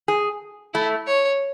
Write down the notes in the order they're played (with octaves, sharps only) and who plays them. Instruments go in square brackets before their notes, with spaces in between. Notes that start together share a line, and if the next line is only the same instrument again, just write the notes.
[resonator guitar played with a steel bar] G#4
[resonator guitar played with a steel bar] A3 [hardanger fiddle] E4
[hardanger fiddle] C#5